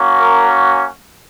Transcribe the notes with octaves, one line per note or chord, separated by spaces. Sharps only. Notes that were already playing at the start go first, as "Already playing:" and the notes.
Already playing: A#3 C#4 F#4
A#4